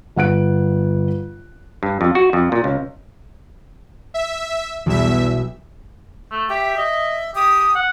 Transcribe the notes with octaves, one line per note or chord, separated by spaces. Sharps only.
G1 F#5 F#6 D7
G2
F2
F#4
F2
A#2
C#2
E5
B1 E2 G3 E5 D7
A3
G4 E5
D#5
G4 D#6
F#5